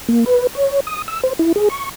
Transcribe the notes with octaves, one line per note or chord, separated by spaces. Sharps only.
A#3
B4
C#5
D#6
E6
C5
E4
G#4
C#6